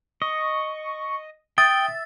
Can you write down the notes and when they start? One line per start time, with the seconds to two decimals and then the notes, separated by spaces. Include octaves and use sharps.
0.22 D#5 C#6
1.58 E5 G5 D#6 A6